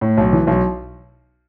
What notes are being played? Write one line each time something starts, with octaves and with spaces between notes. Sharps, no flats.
A2
B1
E3
B1